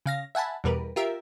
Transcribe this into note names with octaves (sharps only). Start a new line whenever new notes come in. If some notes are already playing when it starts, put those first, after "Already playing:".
C#3 F5 A#6
E5 F#5 G#5 A5 B5
E2 B2 G3 A#4 B4
F4 G4 A#4 E5